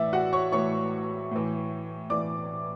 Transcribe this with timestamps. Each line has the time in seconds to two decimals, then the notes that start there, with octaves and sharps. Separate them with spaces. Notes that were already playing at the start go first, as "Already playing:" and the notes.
Already playing: A2 E3 D5 E5
0.13 F#4 F#5
0.33 C#5 C#6
0.52 A2 E3 C#5 C#6
1.31 A2 E3
2.10 A2 E3 D5 D6